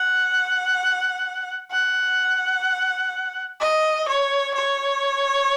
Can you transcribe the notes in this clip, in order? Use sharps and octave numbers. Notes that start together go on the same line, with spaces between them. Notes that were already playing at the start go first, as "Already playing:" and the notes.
Already playing: F#5
F#5
D#5
C#5
C#5